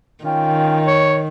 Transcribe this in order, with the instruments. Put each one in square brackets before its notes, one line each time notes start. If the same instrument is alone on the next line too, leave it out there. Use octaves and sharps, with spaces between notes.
[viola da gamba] D#3 [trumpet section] C#4 F4 G5
[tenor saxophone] C#5